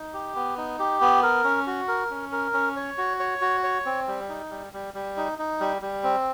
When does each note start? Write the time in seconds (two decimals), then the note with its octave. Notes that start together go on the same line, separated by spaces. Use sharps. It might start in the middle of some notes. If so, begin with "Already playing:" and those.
Already playing: D#4
0.14 G4
0.36 B3
0.58 D#4
0.79 G4
1.01 B3
1.23 A#4
1.44 C#4
1.67 F#4
1.88 A#4
2.11 C#4
2.32 A#4
2.54 C#4
2.77 C#5
2.98 F#4
3.20 C#5
3.42 F#4
3.64 C#5
3.86 C4
4.07 G3
4.29 D#4
4.50 G3
4.73 G3
4.94 G3
5.17 D#4
5.39 D#4
5.60 G3
5.82 G3
6.03 C4